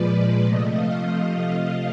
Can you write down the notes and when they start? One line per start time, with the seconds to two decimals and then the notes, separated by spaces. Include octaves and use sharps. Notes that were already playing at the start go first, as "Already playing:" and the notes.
Already playing: A#2 F3 G#3 B4 D5
0.42 C3 F3 A3 D#5
0.75 F5